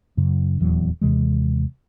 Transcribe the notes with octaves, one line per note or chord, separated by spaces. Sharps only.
F#2 C#3
D#1 E2 F#3
D#2 C3 E3 G#3